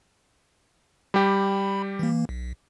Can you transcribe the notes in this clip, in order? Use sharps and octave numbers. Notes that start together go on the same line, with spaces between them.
G3 G4 B5
E3 A#3
B1